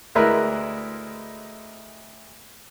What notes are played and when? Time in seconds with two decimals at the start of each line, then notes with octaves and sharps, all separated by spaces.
0.15 D2 G#3 E4 A#4 B4